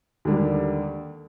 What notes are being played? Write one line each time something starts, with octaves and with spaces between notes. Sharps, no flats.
D#2 D3 G3